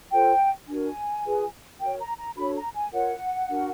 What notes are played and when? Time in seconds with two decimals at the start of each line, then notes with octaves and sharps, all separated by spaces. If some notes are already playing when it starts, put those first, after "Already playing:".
0.12 F4 A4 C5 G5
0.68 D4 F#4 A#4 G#5
1.25 F4 G#4 B4
1.80 F#4 A#4 C#5 G5
2.00 A#5
2.18 A#5
2.37 D4 F#4 A4 C#5 B5
2.56 A#5
2.75 G#5
2.93 F4 A#4 C#5 F#5
3.49 D4 F#4 A#4